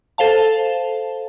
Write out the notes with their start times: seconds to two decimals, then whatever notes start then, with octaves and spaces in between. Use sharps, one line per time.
0.18 A4 C5 F5 A5